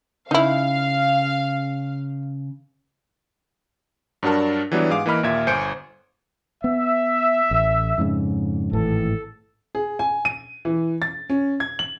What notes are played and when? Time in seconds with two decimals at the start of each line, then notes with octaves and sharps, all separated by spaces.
0.31 C#3 D#4 E4 F5
4.23 G2 F#3 D4 F#4 A#4 A5
4.71 E3 F#3 G3 B3 D4
4.90 G#2 G#4 F5 D6
5.06 E3 A#3 D#5 B5 F6
5.23 D#2 A#2 E5 G#6
5.47 G1 C5 G#5 G6 C#7 D7
6.64 B3 E5
7.51 A1
7.98 F2 G#2 C#3
8.73 G#1 A2 E3 A4
9.75 G#4
9.99 G#5
10.25 D#7
10.65 E3
11.02 A6
11.30 C#4
11.60 G#6
11.79 F#7